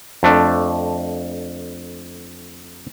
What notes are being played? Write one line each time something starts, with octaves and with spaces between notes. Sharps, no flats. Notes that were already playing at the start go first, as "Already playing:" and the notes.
F2 A3 D4